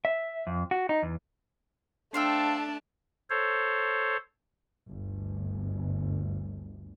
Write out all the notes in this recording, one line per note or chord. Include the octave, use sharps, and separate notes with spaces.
E5
F2
F#4
D#4
E2
A3 D4 C5 F5 G5 A5 E6 C7
A4 C5 C#5
G1 D2